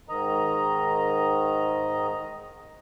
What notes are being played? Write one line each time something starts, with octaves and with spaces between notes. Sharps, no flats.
G#2 D#3 D#5 A#5